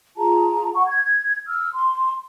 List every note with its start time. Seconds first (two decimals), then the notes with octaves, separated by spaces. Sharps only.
0.17 F4 G#4 A5 A#5
0.74 F#5 C#6
0.86 G#6
1.46 E6 F6
1.75 C6